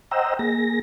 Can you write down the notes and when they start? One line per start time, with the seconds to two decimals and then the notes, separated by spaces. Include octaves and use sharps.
0.11 C5 D#5 F#5 G5 A#5 E6
0.39 A#3 G#4 A#6